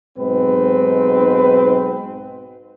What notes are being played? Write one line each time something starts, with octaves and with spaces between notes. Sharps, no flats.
B1 G#2 C4 B4